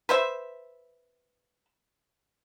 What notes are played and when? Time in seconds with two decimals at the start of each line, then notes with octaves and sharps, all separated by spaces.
0.09 B4 C5 E5